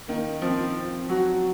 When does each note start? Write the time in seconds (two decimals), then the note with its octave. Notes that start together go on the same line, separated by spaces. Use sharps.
0.08 D#3 A#3
0.42 F3 C4
1.09 F#3 F#4